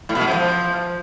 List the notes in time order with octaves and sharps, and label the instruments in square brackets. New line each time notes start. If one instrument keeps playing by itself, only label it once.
[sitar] A2
B2
G#3
C3
F3